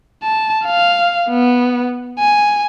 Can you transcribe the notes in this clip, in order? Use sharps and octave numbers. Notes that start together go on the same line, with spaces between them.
A5
F5
B3
G#5